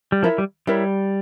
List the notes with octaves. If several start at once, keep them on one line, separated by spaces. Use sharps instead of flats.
G3
F3 E4 A#4 C#5 E5
G3
G3 E4 A#4 C#5 E5